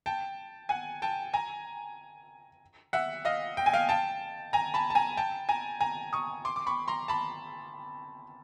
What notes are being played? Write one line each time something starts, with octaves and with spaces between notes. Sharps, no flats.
G5 A5
F#5 G#5
G5 A5
G#5 A#5
E5 F#5
D#5 F5
G5
G#5
F5 G5
G5 A5
G#5 A#5
A5 B5
A5
G#5 A#5
G5 A5
G#5 A#5
G#5 A#5
C#6 D#6
C6 D6
D6
B5 C#6
A#5 C6
A5 B5